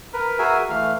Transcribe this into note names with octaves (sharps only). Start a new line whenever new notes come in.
A#4 B4
F#4 G#4 A#4 E5 G#5
E3 A3 F5 F6